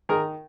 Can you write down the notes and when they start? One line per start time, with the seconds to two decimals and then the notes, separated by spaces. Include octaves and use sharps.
0.09 D#3 G#4 A#4